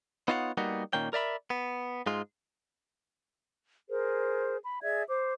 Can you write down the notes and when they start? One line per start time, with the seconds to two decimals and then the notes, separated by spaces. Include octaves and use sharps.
0.28 B3 D#4 F4 C#5 E5 F#5
0.57 G3 A#3 B3 D#4 F#4
0.93 A#2 D#3 A#3 C#4 G5
1.13 A#4 D5 E5 B5
1.50 B3
2.06 G#2 G#3 F4
3.89 G#4 A#4 C5
4.65 B5
4.82 G#4 D5 E5 G#6
5.08 C5 D6